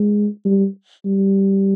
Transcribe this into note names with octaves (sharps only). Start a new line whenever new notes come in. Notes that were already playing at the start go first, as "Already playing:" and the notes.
Already playing: G#3
G3
G3